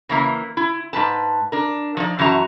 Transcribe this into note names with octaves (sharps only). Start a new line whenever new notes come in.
C#3 E3 A#3
E4
G#2 G#3 B4 A5
D4 A#4
F3 D#4 D5
F#2 E3 F#4 A5 A#5